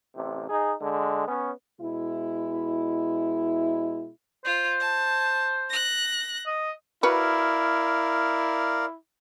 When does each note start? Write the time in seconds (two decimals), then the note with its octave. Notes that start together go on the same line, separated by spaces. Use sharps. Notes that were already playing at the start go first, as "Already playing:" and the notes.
0.15 A1 C3
0.50 D#4 G#4
0.82 D3 G#3
1.28 B3 C#4
1.80 B2 G#3 E4
4.45 F4 C5
4.80 A5
5.70 F#6 A#6
6.46 D#5
7.03 E4 F#4 A#4 B4 D5 F5